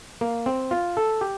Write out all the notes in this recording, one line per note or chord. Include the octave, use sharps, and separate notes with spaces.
A#3
C4
F4
A4
G4